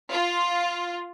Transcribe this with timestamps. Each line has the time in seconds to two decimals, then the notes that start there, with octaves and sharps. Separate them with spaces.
0.10 F4